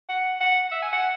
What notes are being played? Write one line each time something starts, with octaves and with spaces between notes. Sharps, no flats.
F#5
F#5
E5
G#5
F#5